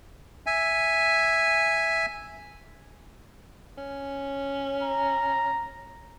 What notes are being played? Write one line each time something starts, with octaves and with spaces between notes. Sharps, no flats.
E5 G#5
C#4
A#5